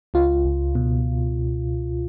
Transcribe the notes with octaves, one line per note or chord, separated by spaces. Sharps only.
C#2 F4
C#2
B2